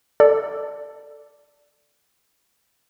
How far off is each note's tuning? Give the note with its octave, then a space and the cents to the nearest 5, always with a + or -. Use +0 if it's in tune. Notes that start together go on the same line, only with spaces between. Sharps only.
A4 +15 D5 +0